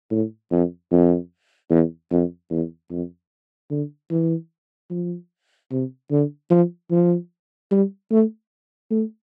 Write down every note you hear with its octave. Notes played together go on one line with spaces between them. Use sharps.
A2
F2
F2
E2
F2
E2
F2
D3
E3
F3
C3
D3
F3
F3
G3
A3
A3